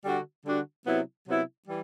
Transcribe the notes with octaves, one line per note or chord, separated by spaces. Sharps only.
D3 G3 D4 F#4
D3 G3 D4 F#4
C3 F#3 B3 E4
C3 F#3 B3 E4
E3 G3